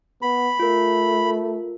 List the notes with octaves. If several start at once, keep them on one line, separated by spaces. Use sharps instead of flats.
B3 B5
A3 F4 A#4